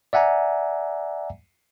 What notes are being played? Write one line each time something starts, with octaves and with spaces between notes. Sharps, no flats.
D5 E5 F#5 G#5 A#5